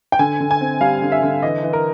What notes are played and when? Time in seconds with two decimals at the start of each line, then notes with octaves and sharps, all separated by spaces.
0.12 G5
0.19 D3 G#5
0.40 D3
0.51 G#5
0.61 C4
0.81 G3 F5
1.02 D3
1.12 E5
1.23 D3
1.43 E3 D#5
1.63 E3
1.73 A#4